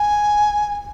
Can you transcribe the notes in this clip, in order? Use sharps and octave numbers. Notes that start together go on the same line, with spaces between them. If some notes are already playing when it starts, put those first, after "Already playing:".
Already playing: G#5